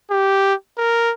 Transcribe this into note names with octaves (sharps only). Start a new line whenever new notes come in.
G4
A#4